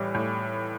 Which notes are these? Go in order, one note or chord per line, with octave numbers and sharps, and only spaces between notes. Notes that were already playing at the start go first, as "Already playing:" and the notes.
Already playing: A2 E3 G3
A2